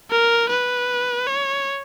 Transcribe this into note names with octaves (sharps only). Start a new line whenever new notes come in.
A#4
B4
C#5